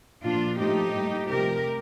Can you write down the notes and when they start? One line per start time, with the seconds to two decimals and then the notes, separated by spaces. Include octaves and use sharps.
0.24 A#2 F3 A#3 D4 F4
0.59 A2 F3 A3 D#4 G4
0.95 A2 G3 A#3
1.30 C3 F3 A3 G4 A#4